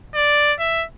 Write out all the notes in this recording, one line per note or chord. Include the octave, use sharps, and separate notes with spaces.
D5
E5